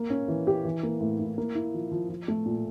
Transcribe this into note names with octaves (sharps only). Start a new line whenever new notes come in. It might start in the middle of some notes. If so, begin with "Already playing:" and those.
Already playing: A#3
C#4
E3
G4
E3
A#3
A2
E4
A#3
E4
F3
F3
F3
A3
A#2